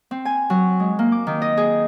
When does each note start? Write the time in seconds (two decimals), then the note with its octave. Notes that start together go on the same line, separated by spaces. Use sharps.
0.11 C4
0.25 G#5
0.50 F#3
0.80 G#3
0.99 A#3
1.12 D6
1.27 D#3
1.42 D#5
1.57 G#4